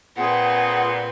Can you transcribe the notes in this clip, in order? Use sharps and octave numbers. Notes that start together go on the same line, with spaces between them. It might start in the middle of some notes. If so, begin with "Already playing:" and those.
A#2 C4 G#4 B4 F#5